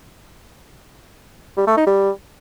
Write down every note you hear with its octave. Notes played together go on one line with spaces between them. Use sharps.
G3
A3
D#4
G3